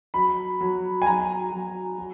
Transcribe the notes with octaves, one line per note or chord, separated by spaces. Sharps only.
F#3 B5
F#3
G#5
F#3 A#5
F#3
F#3